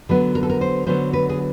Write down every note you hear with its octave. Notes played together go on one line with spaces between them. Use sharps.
D3 F#3 B3 B4
A#4
A4
A#4
C5
D3 F#3 B3 C5
B4
G#4